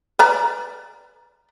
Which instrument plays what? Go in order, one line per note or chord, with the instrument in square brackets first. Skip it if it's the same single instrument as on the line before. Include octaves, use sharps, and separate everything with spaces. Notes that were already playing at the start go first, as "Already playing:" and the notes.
[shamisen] B4 D5 A#5